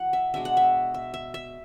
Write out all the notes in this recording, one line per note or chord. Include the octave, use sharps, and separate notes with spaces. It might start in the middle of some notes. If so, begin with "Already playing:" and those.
Already playing: E3 F#4 F#5
E5
B2 G#3 D4 E5
F#5
E5
E5
E5
E5